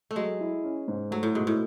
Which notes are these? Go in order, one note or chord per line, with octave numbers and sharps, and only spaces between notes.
A3
F#3 G#3
E4
C#4
G#2
F#3 A3
A2
G#2 B2
A2